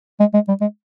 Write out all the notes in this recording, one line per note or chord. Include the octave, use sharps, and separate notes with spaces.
G#3
G#3
G3
G#3